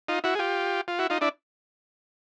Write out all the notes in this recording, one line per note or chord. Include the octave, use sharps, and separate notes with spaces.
D#4 F4
E4 F#4
G#4
F4 G4
F4
E4 F#4
D#4 F4
D4 E4